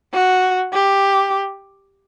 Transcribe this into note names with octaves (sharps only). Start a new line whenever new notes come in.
F#4
G4